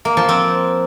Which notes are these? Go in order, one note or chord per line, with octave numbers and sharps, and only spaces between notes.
A#3
F3
C4